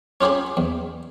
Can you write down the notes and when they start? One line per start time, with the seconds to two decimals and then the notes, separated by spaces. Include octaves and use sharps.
0.21 C#4 F4 G4 G#4 B5
0.57 E2